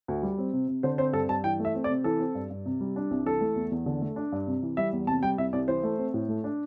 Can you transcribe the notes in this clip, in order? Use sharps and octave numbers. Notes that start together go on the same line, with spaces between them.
D2
G3
C4
C3
C3
D3 C5
C4 C5
G2 A4
G2 A5
E3 G5
A3
E5
C4
D5
C3
E3 A4
C4
G2
G2
C3
G3
D4
C2
E3 A4
A3
E2
E2
D3
A3
D4
G2
C3
E3
G3 E5
E2
C3 A5
G3 G5
C2 E5
C2 D5
E3 C5
A3
C4
A2
A3
D4